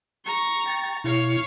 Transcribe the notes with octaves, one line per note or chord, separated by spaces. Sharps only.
A#5 C#6
G5 A6
B2 E4 C#5 F5